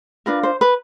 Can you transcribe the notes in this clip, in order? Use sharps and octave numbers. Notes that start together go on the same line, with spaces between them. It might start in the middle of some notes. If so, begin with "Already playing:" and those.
D4 F4 A#4 B4
C5
B4